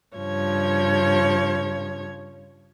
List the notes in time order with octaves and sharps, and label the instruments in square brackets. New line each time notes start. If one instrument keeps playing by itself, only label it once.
[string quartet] G2 C#3 F3 C#5 G#6